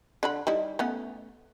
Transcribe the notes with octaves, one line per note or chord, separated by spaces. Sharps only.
D3 F#5 B5
G3 D#4 E4
A3 B3 C#4